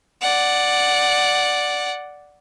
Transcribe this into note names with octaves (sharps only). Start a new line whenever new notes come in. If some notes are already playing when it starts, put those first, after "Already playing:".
D5 F#5